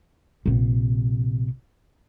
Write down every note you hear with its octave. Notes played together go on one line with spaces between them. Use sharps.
A#1 C3